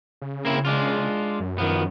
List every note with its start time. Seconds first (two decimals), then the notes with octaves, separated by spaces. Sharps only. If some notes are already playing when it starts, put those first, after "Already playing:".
0.22 C#3
0.45 A#3 C4 E4
0.65 G#3 D4 F4
1.40 F#2
1.58 D#3 F3 B3